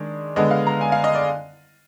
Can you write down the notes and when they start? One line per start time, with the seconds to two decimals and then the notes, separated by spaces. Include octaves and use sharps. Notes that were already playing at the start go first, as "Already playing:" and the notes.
Already playing: D#3 G#3 D4
0.36 D3 G#3 B3 D4 D#5
0.51 F5
0.67 A#5
0.81 G#5
0.92 F5
1.04 D#5
1.15 D5